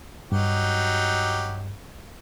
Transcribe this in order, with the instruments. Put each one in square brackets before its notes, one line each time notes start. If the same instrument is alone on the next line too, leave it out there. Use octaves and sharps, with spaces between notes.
[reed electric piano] G2 [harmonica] F#3 D#4 G4